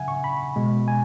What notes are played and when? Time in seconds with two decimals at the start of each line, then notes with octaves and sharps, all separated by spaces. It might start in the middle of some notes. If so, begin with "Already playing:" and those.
Already playing: C#3 F#3 E5 F#5 G#5
0.08 C#6
0.24 B5
0.56 B2 G#3
0.88 G#5